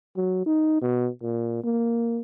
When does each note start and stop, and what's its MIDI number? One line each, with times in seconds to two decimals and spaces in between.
0.16 0.42 54
0.46 0.80 63
0.82 1.09 47
1.22 1.63 46
1.64 2.21 58